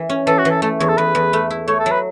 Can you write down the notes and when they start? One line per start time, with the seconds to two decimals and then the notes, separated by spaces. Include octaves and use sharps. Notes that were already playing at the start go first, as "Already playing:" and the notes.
Already playing: E3
0.09 C#4
0.27 E3 A4
0.39 F#4
0.45 E3
0.50 A4
0.62 A3 A4
0.80 E2 C#5
0.89 A4
0.97 E2 B4
1.15 E2
1.33 A3
1.50 E4
1.68 A3 C#5
1.80 A4
1.86 F#3
1.91 B4